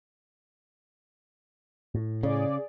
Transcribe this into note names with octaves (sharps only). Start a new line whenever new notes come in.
A2
C#3 G#4 D5